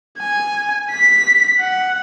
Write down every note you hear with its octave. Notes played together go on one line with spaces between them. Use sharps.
G#5
B6
F#5